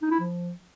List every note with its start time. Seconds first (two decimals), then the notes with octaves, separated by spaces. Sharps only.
0.02 D#4
0.11 E4
0.20 F3